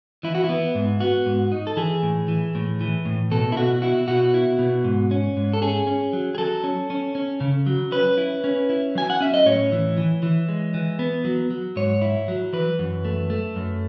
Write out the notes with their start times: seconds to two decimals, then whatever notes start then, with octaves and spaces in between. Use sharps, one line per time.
0.23 E3 E4
0.35 F#4
0.44 E4
0.49 B3
0.75 G#2
1.00 B3 F#4
1.26 G#2
1.52 D#4
1.67 A4
1.77 E3 G#4
2.03 A2
2.28 E3
2.55 A2
2.81 E3
3.05 A2
3.31 B2 A4
3.52 E4
3.56 B2 F#4
3.82 E4 F#4
4.08 B2 F#4
4.34 E4
4.59 B2
4.84 G#2
5.11 C#4
5.37 G#2
5.53 A4
5.62 C#4 G#4
5.87 C#4
6.13 F#3
6.35 G#4
6.38 F#3 A4
6.64 C#4
6.90 C#4
7.15 C#4
7.40 C#3
7.66 F#3
7.92 C#4 B4
8.18 E4
8.44 C#4
8.70 E4
8.95 F#3 G#5
9.10 F#5
9.21 C#4 E5
9.34 D#5
9.46 A2 C#5
9.72 E3
9.97 E3
10.23 E3
10.48 G#3
10.74 E3
10.99 B3
11.25 F#3
11.51 F#3
11.76 G#2 C#5
12.02 E4
12.28 F#3
12.53 E3 B4
12.79 F#2
13.05 A3
13.30 A3
13.56 F#2